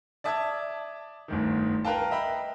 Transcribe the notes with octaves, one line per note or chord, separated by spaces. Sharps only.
D5 E5 A5 D#6 G#6
G1 D2 D#3
A#4 B4 F5 G5 A5
D#5 E5 G5 B5